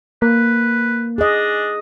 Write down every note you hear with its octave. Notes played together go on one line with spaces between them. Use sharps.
A#3 B4
D4 G#4 D#5